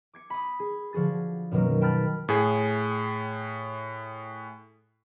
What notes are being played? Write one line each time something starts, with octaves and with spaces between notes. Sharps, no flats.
D6 G#6 C#7
B5 D#6
G#4
D3 F3 F#4 G#4 A6
F#2 B2 D#3 F#3 A#3
G5 A5 B5 F6 G6 A6
A2 G#4